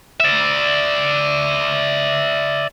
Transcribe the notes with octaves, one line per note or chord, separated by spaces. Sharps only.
D5 E5